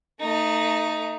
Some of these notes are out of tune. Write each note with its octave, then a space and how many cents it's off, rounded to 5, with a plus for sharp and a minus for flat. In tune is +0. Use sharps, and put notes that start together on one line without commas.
A3 +30 D#4 +0